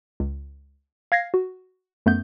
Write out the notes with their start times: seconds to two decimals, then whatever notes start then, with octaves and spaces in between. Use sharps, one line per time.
0.20 C#2
1.12 F5 G#6 A#6 C7
1.34 F#4
2.06 F#2 A3 B3 G6